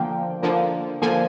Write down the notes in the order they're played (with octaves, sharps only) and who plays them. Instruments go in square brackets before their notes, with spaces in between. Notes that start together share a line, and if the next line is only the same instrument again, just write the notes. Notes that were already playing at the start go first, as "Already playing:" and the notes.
Already playing: [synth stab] D3 F3 A#3 G5
D3 F3 A#3
D3 F3 A#3 G#5